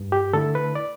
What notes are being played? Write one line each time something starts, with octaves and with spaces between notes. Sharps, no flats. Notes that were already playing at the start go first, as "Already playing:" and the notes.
Already playing: G2
G4
D3 A3 E4 A4
B4
D5